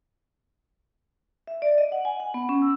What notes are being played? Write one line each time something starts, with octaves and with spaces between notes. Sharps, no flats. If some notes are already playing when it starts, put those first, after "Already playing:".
E5
D5
D#5
F#5
G#5
F#5
B3
C#4
E6